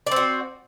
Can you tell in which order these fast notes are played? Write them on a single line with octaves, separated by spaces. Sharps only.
D5 C4 F#4